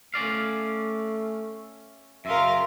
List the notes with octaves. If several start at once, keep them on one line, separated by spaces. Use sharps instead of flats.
A3 C#4 D5 F5
F#2 C#3 A#4 E5 F5 C6